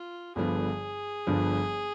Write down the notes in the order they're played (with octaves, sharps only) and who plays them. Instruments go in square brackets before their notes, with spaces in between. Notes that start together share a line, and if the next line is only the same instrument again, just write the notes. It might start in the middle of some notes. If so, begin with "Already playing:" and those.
Already playing: [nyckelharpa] F4
[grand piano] G1 G2 D3 F3 B3 [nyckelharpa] G#4
[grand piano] G1 G2 D3 F3 B3